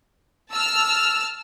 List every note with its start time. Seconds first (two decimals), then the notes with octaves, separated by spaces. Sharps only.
0.51 A5 E6 F6